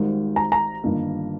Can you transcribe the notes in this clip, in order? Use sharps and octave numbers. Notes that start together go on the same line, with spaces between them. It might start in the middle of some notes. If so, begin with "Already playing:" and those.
Already playing: G#1 G#2 D#3 G3
A#5
A#5
G1 G2 D#3 A#3 D#4